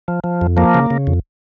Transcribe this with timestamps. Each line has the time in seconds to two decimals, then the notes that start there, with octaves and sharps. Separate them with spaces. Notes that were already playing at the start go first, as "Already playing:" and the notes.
0.08 F3
0.24 F3
0.41 F2
0.57 F3 A#3
0.74 C#3
0.90 C#3
1.07 F2